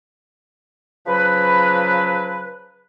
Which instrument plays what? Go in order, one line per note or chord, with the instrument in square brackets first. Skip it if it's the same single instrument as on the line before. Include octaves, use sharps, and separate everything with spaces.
[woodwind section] C#3 F3 F#3 B4